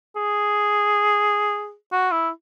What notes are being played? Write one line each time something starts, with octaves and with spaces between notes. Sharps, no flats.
G#4
F#4
E4